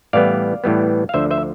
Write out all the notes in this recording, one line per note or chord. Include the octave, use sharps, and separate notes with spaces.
A2 E3 G3 B3 D5 F5
A2 E3 G3 B3
F5
D2 D3 F3 C5 E5
C5 E5